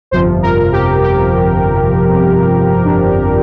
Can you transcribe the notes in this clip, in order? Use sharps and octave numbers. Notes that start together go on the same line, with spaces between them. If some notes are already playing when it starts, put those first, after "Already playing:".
G1 F2 C3 F3 C5
A#4
G4
G4
D4